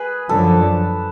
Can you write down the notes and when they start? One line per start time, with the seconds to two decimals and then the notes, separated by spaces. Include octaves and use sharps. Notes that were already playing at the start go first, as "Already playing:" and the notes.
Already playing: G#4 B4
0.28 F#2 D3 F3 A4